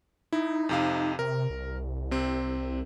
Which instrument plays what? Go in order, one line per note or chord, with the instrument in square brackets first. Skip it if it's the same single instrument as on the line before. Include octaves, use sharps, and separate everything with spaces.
[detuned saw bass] D#4 [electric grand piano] E4
[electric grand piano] F2 C3 F5
[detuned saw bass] C3 [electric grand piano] A#4
[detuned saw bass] C2
[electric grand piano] C3 C4